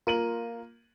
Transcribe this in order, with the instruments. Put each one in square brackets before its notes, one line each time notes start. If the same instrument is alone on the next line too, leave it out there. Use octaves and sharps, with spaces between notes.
[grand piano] A#3 D#7 F#7 [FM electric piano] F4